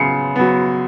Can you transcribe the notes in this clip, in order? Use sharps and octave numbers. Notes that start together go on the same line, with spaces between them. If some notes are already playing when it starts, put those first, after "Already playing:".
Already playing: C#3 F#3 B3 C7 C#7
F#3 B3